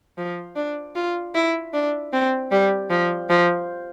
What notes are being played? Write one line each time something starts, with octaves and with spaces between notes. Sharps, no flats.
F3
D4
F4
E4
D4
C4
G3
F3
F3